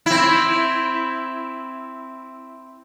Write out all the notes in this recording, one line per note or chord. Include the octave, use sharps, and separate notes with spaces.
C4 E4